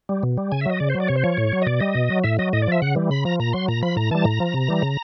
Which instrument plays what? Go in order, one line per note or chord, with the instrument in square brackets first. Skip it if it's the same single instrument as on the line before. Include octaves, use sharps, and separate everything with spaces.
[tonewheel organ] G3
B2
G3
C#3 G#5
E5
F#3 D#5
C#3 D5
C5
F#3
D5
C3 C#5
C5
F3 C#5
A2
F#3
D#5
B2 D5
G3 D#5
B2
F#3
A2 E5
F#3 D#5
A2 D#5
D5
F3 E5
C#3 F#5
E3 G3
C#3 B5
F3 A#5
A#2 A#5
F#3 C6
A#2 A#5
F3 B5
A2 A#5
E3 G3 A5
A2 A#5
F3
C3
E3 G3
C#3